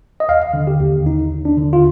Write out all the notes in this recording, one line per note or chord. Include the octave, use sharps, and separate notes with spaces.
D#5
D#2 F5
D3
G4
D#2
D#2 D#4
D#2
D4
D3
F4